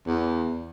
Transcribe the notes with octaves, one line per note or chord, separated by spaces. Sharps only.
E2